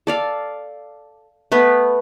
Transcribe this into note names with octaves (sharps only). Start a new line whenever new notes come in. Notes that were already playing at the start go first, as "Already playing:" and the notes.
A4 D5 F5
A3 B3 B4